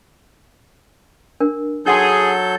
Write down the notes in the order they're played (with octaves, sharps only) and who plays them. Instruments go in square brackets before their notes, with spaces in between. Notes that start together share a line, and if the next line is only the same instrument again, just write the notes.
[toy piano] D4 A#4
[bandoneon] F#3 A4 G6 [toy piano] D#4 F#5 C6 [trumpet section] G#4